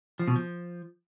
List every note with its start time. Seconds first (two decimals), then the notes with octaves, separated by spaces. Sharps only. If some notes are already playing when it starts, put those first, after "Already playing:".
0.20 F3
0.28 B2
0.36 F3